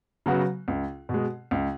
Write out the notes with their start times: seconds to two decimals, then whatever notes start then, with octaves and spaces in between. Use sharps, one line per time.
0.26 C#3 F#3 B3 F#4
0.68 C#2
1.09 B2 G#3
1.51 C#2